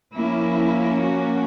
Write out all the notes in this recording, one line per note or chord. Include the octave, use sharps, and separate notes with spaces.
F3 A#3 C#4 E4
F#4